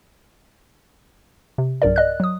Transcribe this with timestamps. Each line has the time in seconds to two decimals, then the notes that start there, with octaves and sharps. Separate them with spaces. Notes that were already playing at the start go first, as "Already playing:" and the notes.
1.58 C3
1.82 B1 G2 A#4 D5
1.96 D5 D#5 F#6
2.20 F#3 D#6